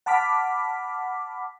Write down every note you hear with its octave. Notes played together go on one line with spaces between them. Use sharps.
F#5 A5 B5 D6 F6 B6